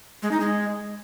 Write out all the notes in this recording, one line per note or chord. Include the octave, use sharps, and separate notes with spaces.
G#3
D#4
G#3